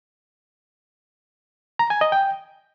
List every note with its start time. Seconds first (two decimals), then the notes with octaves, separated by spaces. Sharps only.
1.79 A#5
1.90 G#5
2.01 D#5
2.12 G5